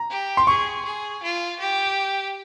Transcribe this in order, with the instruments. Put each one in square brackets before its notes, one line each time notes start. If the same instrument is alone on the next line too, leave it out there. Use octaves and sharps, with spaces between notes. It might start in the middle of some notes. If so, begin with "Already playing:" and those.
Already playing: [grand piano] A#5
[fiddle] G4
[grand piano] C6
[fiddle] G#4 [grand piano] C#6
[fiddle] G#4
F4
G4